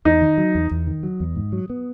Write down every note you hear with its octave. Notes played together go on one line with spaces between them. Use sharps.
E2 D#4
D#3
F#3
E2
E2
D#3
F#3
E2
G#2
F#3
B3